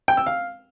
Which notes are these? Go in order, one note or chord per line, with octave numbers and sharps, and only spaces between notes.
G5
E6
F5